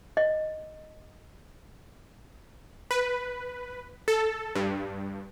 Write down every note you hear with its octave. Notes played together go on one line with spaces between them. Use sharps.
D#5
B4
A4
G2